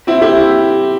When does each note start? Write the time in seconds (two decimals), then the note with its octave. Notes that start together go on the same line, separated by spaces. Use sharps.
0.07 C4 E4
0.22 E4 G4